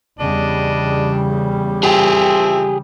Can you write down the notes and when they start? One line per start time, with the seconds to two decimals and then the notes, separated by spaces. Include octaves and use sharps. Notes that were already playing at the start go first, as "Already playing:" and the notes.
0.20 E2 C#3 G3 D4 D#5
1.83 F3 C4 G4 G#4 E5